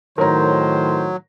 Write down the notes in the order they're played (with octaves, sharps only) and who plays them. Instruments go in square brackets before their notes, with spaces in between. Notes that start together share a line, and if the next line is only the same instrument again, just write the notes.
[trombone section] A2 D#3 [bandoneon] F#3 [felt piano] A#4 C#5 A#5 [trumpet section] C5